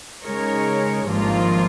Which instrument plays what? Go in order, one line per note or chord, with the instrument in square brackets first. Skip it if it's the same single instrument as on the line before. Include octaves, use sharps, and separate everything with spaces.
[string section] C#3 G#3 D#4 A#4 C#5
G#1 G2 F3 A#3 F4